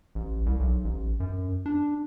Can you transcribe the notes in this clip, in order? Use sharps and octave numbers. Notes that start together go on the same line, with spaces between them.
A1
C2
B1
A1
F#2
D4